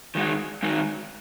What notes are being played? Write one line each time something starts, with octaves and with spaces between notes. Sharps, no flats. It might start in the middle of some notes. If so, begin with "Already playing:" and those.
D#3 G#3 D#4 F#4
D#3 G#3 D#4 F#4